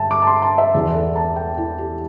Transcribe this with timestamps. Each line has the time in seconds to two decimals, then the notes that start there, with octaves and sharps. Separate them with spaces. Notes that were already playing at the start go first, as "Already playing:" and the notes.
Already playing: G2 D3 E5 G5 A5
0.11 D6
0.22 A5
0.27 C6
0.42 A5
0.58 E5
0.74 E2 E3 D5
0.95 A4
1.16 A5
1.36 G5
1.58 E4
1.78 G4